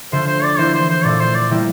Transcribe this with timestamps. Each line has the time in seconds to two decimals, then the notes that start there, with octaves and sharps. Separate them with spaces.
0.12 D3 F3 A3 C5
0.27 C5
0.43 D5
0.58 E3 A#3 E4 C5
0.74 C5
0.89 C5
1.04 A#2 F3 A3 D5
1.20 C5
1.35 D5
1.50 E3 G3 A#3 E4 G4